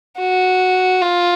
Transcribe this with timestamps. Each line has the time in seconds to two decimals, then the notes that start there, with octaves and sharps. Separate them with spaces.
0.19 F#4
1.01 F4